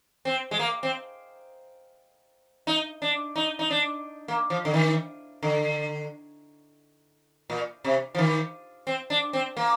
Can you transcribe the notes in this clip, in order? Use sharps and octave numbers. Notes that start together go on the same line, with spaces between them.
C4
G#3
A#3
C4
D#4
D4
D#4
D#4
D4
A#3
F3
D3
D#3
D3
A#2
C3
F3
D#3
C4
D4
C4
A#3